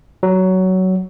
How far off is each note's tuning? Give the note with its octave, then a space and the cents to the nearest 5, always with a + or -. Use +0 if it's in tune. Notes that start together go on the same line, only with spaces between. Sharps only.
F#3 +15